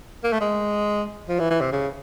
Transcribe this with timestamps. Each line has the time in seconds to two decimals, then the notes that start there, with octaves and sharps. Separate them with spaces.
0.24 A#3
0.33 A3
0.41 G#3
1.29 F3
1.40 E3
1.50 E3
1.61 C3
1.72 C#3